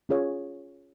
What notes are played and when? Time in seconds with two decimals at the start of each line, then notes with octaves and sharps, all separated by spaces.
0.09 C#4 F4 G#4 C#5